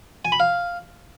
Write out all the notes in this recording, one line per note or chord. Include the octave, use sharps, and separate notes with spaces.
G#5
B5
F5